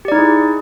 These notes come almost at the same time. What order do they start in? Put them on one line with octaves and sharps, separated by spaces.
G4 D5 D#4 E4 G#4